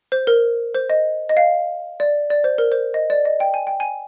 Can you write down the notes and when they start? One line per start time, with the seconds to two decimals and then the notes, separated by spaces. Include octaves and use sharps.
0.12 C5
0.27 A#4
0.74 C5
0.90 D#5
1.29 D#5
1.37 F5
2.00 D5
2.30 D5
2.44 C5
2.58 A#4
2.72 C5
2.94 D#5
3.10 D5
3.25 D#5
3.40 G5
3.54 G#5
3.67 G5
3.80 G#5